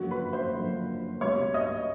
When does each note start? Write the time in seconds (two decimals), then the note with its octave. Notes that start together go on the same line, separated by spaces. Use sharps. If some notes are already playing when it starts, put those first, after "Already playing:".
Already playing: F#1 F#2 D3 F3 F#4
0.11 B4 B5
0.33 C5 C6
0.55 F#1 F#2 D3 F3
1.21 C#2 B2 G3 C#5 C#6
1.54 D#5 D#6